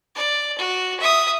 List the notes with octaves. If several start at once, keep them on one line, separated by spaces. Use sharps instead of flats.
D5
F#4
E5 D#6